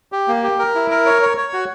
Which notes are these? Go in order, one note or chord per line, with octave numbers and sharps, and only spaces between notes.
G4
A#3
G4
A#4
E4
A#4
C#5
C#5
C#5
F#4